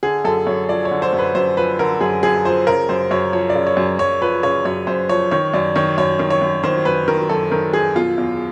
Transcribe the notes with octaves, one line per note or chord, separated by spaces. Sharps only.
D3 G#4
F#2 A4
F#2 C#5
F3 D5
C#5
D3
C5
F#2
B4
F#2 C5
F3 B4
D3 A#4
F#2 G#4
F#2 G#4
F3 C5
C#3 A#4
F#2 C5
F#2 C#5
F3 C#5
D5
C#3
C#5
F#2
F#2 C#5
F3 B4
C#3 C#5
F#2 C#5
F#2 C5
F3 C#5
D#3 C#5
F#2 D5
D#3 C#5
F#2 C#5
D#3
C#5
F#2
D#3 C5
F#2 B4
D#3 A#4
F#2 A4
D#3 A#4
F#2 G#4
B2 F4
E2